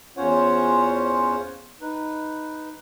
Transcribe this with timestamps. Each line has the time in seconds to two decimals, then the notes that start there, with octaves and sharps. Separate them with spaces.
0.17 E2 C#4 F4 C5 C#5 F#5
1.82 D#4 B4